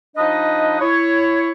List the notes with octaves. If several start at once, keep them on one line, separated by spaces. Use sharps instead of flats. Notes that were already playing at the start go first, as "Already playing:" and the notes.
F3 D4 D#4 B4 D#5
E4 C#5